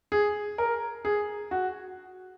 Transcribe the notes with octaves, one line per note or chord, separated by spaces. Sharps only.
G#4
A#4
G#4
F#4